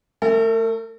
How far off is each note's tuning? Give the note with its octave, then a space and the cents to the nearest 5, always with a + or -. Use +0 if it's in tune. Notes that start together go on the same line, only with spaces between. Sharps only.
A3 +5 A#4 -45